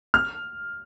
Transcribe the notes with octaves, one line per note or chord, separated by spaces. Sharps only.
F6